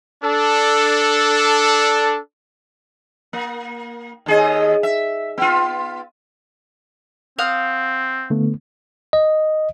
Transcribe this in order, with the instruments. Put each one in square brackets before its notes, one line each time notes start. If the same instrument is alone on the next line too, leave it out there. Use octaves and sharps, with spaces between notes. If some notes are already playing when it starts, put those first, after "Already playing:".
[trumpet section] D4 A4
[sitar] A#3
D#2 G#4 D#5
E5
B3 F4
[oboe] C4 [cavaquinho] F5 F#5 D#6
[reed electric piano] D3 A3 B3
[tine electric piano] D#5